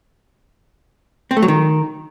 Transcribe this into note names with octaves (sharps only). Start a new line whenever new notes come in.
C4
A3
F#3
D#3